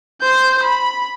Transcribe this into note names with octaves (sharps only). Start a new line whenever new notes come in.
C5 G6
B5